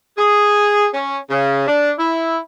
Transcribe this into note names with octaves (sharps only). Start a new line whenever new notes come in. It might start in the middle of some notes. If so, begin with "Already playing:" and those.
G#4
C#4
C#3
D4
E4